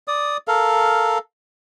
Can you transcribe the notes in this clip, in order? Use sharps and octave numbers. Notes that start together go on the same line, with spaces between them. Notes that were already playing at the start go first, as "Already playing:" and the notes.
D5 D#6
A4 A#4 F5